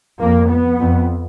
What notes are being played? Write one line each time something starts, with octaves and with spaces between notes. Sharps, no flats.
F2 A#3
B3
F2